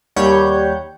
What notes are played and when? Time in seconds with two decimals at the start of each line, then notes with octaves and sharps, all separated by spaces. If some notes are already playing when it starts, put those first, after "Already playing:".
0.16 D#2 G3 C#5 F#5 G6